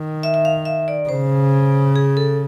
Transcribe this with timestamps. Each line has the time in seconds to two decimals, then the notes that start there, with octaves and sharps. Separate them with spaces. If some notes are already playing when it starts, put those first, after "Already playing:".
Already playing: D#3
0.23 E5
0.34 E5
0.45 F5
0.65 E5
0.88 D5
1.09 C#3 C5
1.96 G#4
2.17 A4